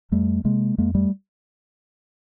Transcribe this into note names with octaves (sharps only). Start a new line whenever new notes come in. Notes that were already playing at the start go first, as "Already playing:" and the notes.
F2 G3 A3
C3 G#3 A#3
F2 G#3 A#3
G3 A3